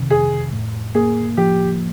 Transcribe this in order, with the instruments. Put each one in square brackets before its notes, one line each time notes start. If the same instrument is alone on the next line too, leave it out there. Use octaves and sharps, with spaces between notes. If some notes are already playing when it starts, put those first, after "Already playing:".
Already playing: [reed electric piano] F2 C3 D#3
[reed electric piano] F2 [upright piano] G#4
[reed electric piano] A2
[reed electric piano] A#3 [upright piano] G#4
[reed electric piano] F3 [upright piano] G4